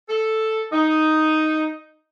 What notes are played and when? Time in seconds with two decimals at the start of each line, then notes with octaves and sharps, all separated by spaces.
0.09 A4
0.73 D#4